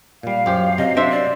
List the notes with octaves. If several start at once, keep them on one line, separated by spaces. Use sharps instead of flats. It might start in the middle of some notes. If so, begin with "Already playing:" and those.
A#2 G3 F5
F#2 F4 G4 C5
C3 F#3 D#5
D4 C5 E5
D5